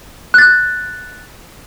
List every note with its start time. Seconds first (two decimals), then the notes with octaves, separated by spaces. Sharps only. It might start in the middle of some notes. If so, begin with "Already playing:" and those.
0.34 F#6 A6